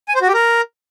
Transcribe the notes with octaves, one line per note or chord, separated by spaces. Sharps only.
G#5
C5
F#4
G4
A#4